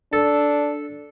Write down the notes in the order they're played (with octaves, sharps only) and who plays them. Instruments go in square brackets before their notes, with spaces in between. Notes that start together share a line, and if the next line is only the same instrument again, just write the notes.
[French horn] D4 [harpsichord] A4